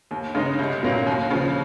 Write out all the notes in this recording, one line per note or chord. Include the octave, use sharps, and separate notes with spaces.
D#2
C#3 G#3 D#4
C2
A#2 F#3 A#3 C#4
D#2
C#3 F3